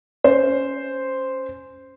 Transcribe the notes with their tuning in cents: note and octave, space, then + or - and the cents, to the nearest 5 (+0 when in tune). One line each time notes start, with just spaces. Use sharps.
C#4 +0 C5 -5